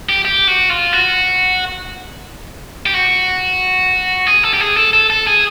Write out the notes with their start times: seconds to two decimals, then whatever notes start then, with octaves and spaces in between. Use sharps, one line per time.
0.09 G4
0.25 G4
0.48 F#4
0.70 F4
0.93 F#4
2.86 G4
2.94 F#4
4.27 G#4
4.43 A4
4.54 G4
4.60 G#4
4.77 A4
4.93 A4
5.10 A4
5.27 G#4